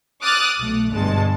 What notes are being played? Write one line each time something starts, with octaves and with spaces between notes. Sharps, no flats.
D6 D#6 F6 F#6 A6
B1 A3
G1 G2 B2 G#3 A5